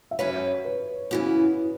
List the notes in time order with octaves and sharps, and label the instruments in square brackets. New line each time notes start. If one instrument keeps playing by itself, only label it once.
[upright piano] E5
[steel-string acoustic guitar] F#2 F#3 C#4 F#4 B4 [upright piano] C#5
[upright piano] B4
[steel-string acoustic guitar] C#3 E3 B3 [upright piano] F#4